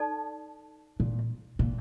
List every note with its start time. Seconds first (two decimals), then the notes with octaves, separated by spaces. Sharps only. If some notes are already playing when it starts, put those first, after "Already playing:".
Already playing: D#4 A4 D5 A5
1.00 A#2
1.59 A#2